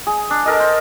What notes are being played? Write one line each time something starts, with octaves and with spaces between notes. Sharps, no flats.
G#4
D4
A4 A#4 D#5
C5